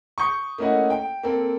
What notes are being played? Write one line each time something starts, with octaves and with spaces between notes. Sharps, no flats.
C#6 D#6 G6 C#7
A3 A#3 C#4 E4 D#5 F#5
G5 D7
A#3 C4 A4